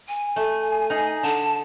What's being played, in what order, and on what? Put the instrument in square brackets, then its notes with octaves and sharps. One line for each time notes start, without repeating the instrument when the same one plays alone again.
[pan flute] G#5
[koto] A3
D#4 G#4
[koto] D3 [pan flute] A5